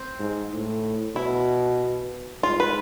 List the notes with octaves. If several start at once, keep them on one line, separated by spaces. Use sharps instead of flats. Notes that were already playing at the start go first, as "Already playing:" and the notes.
Already playing: C4
G#2
A2
B2 E4
G#2 F4
B4